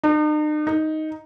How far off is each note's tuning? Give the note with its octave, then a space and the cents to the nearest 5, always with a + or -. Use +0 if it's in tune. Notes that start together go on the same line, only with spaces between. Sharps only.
D#4 -45
D#4 +5